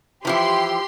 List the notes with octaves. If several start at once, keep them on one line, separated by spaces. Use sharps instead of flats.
E3 F3 E4 G4 C6